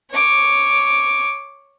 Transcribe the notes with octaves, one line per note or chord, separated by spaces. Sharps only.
C#5 D6